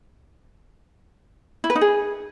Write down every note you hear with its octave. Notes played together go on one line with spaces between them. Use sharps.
E4
B4
D#4
G#4